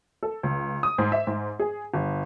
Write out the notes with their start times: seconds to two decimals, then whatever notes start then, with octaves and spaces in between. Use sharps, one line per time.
0.23 A4
0.43 C#2
0.83 D#6
0.98 G#2
1.12 E5
1.27 G#2
1.59 G#4
1.94 G1